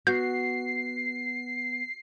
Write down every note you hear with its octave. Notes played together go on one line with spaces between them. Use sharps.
B3 F#4 F#5 G6 C7